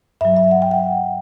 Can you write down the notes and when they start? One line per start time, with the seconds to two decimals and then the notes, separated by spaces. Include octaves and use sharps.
0.21 G2 F#3 E5
0.37 E5
0.51 F#5
0.62 G5
0.71 F#5